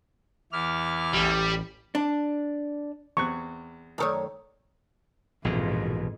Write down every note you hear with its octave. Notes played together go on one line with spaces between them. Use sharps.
E2 E4 D6 F6
A1 G3
D4
E2 C4 C#6 F#6
F#2 D#3 A3 A4 C5 C#5
A#1 F2 G#2 B2 E3